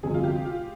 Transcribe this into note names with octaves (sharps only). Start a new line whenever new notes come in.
G1 F2 C3 F3 G#4
F4
G4
F4